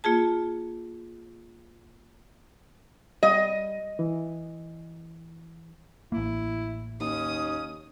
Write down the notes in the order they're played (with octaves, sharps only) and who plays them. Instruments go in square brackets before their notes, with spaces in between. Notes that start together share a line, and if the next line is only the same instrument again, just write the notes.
[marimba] A#3 F4 G#4 A5
[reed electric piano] G3 [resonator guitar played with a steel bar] D#5
[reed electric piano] E3
[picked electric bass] A1 A#3 [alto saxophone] E4
[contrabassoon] D#2 [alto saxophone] C#4 [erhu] D#6